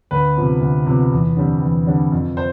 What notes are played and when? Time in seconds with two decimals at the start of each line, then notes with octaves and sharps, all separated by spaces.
0.11 D2 B4
0.37 C3 F3 B3
0.61 D2
0.86 C3 F3 B3
1.12 E2
1.37 D3 G3 C4
1.61 E2
1.87 D3 G3 C4
2.12 F2
2.37 C5